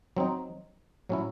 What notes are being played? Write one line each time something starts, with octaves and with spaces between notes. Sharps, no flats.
F#3 C4 D#4
A2 F#3 C#4 E4